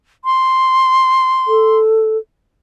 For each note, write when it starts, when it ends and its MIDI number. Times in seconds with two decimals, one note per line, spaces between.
0.25 1.78 84
1.48 2.18 69